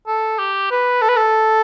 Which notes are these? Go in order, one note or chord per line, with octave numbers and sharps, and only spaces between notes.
A4
G4
B4
A4
B4
A4